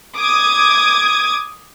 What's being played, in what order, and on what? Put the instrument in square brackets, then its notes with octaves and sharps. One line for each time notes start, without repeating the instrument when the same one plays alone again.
[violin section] D6 D#6 G#6